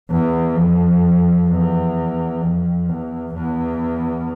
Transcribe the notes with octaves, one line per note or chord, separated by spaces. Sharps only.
E2
F2
E2
F2
E2
E2